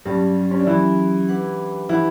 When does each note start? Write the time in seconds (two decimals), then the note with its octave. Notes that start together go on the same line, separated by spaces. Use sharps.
0.05 G2 F#3 G3 C#4 G4
0.51 C#4
0.59 D4
0.67 E3 F#3 C#4 E4 G4
1.28 D4 G4 B4 F#5
1.89 E3 D4 E4 G4 B4 F#5